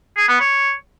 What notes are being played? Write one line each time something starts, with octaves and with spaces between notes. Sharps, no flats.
G#4
B3
C#5